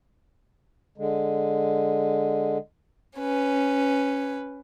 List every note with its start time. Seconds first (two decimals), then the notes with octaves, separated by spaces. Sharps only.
0.98 D3 G#3
3.18 C#4 B4